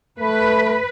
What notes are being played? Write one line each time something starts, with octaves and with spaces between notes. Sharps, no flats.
A3 B4